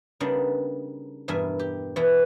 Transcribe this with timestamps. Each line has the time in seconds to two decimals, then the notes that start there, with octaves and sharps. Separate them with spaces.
0.20 C#3 G3 A#3 B3 D4 D#4
1.28 E2 G2 B2 A#4 E5 G#5
1.59 G4
1.96 E2 B2 E3 B3 E4